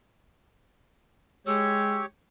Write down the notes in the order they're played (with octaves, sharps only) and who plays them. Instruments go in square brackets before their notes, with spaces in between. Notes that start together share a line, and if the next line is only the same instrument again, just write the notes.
[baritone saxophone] G#3 [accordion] G4 C#5 [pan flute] E6